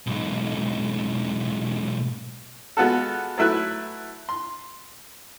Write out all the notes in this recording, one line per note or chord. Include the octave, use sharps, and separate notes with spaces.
B1 G#2
G#3 B3 F4 F#4 A4
F#3 A3 E4 B4 F#6
C6